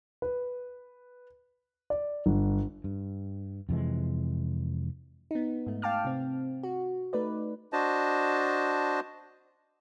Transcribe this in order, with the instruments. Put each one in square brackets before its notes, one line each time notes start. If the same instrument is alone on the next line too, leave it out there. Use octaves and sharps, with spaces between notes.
[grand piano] B4
D5
G1
[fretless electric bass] G2
F2 C3 E3 G#3
[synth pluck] B3 D#4
G#2 A3
F5 G5 A5 D6 F6
C3 C4
F#4
A3 D#4 B4 D5
[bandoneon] D4 F#4 C5 D#5 A5